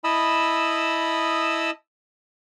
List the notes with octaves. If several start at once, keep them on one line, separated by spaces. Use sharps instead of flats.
E4 D#5 A5 B5 D#6 E6